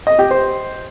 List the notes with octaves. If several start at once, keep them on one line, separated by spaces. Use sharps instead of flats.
D#5
G4
C5